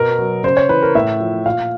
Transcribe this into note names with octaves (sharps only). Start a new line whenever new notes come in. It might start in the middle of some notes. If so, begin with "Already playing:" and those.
Already playing: B2 A#4
F#3
C#3 C5
C#5
E3 B4
A#4
A2 E5
F3
A#2 F5